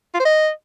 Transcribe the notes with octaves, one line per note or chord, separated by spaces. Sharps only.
F4
C5
D#5